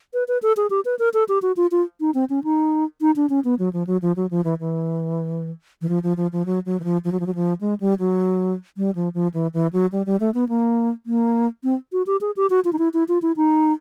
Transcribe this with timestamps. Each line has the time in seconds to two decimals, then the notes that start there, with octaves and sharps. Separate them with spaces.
0.14 B4
0.28 B4
0.42 A4
0.57 G#4
0.70 G4
0.85 B4
0.99 A#4
1.14 A4
1.29 G4
1.42 F#4
1.57 F4
1.72 F4
2.00 D#4
2.14 C4
2.30 C#4
2.44 D#4
3.01 D#4
3.16 D4
3.30 C#4
3.45 B3
3.59 F#3
3.73 F3
3.87 F#3
4.02 F3
4.16 F#3
4.31 F3
4.44 E3
4.60 E3
5.81 E3
5.89 F3
6.03 F3
6.17 F3
6.32 F3
6.46 F#3
6.66 F#3
6.80 E3
6.84 F3
7.04 F3
7.12 F#3
7.20 F3
7.27 F#3
7.35 F3
7.61 G#3
7.80 G3
7.99 F#3
8.77 G3
8.95 F3
9.14 F3
9.34 E3
9.54 E3
9.73 F#3
9.92 G3
10.06 G3
10.20 A3
10.34 B3
10.49 A#3
11.06 A#3
11.64 C4
11.92 F#4
12.07 G4
12.21 G#4
12.37 G4
12.50 F#4
12.65 F4
12.73 D#4
12.79 E4
12.94 E4
13.08 F4
13.22 E4
13.37 D#4